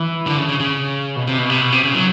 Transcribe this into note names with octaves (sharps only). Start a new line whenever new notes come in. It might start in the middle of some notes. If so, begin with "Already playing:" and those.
Already playing: E3
D3
C#3
C#3
C#3
B2
C3
B2
C3
B2
C3
C#3
F#3